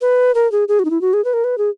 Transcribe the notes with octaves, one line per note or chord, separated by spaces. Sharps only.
B4
A#4
G#4
G#4
F#4
D#4
E4
F#4
G#4
B4
A#4
B4
G#4